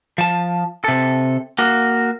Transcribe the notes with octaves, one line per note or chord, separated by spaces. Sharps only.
F3 A5
C3 A4
A#3 F#4